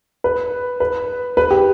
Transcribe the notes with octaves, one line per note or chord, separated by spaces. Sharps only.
B4
B4
B4
G4